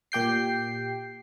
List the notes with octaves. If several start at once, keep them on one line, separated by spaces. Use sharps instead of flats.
A#2 G4 G5 C7